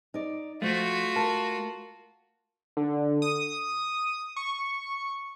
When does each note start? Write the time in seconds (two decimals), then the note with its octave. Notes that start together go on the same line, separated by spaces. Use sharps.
0.14 D#4 D5
0.62 F3 A3 F4 F#4
1.16 A#4 A5 A#5
2.77 D3
3.22 D#6
4.36 C#6